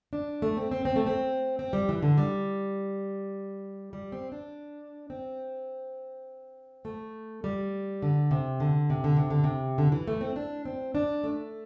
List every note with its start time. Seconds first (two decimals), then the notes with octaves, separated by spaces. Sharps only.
0.13 D4
0.42 A3
0.57 C4
0.71 C4
0.85 C4
0.96 A3
1.07 C4
1.59 C4
1.73 G3
1.89 E3
2.03 D3
2.17 G3
3.93 G3
4.12 C4
4.32 D4
5.10 C4
6.85 A3
7.44 G3
8.02 D3
8.31 C3
8.60 D3
8.90 C3
9.04 D3
9.17 C3
9.30 D3
9.44 C3
9.78 D3
9.92 E3
10.08 A3
10.21 C4
10.36 D4
10.65 C4
10.95 D4
11.24 A3